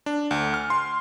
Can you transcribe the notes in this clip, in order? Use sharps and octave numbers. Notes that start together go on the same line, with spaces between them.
D4
D2
F6
C6